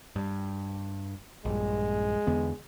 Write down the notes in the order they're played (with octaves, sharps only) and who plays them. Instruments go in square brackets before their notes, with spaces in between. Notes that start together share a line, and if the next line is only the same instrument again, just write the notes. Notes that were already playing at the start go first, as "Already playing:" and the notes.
[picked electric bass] G2
[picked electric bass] A#1 G2 [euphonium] G#3
[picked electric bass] E2 D3 B3